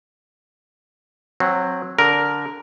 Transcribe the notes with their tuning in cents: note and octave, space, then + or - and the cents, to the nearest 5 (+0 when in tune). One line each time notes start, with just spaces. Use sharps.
F#3 -15 C4 +10
D3 -15 A#4 +0